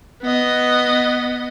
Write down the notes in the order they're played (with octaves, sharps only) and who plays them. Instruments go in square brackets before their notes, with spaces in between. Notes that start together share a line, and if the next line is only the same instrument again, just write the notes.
[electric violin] B3 D#5